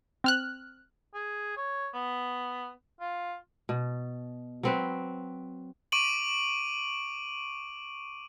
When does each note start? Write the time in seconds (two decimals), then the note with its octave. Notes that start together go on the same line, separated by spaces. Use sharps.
0.24 C4 F6 F#6
1.14 G#4
1.57 C#5
1.94 B3
3.01 F4
3.69 B2
4.63 F#3 C4 B4
5.92 C#6 D6 D7 D#7 F#7